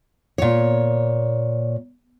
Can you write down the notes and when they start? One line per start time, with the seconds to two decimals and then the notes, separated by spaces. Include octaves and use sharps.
0.38 A#2 C#5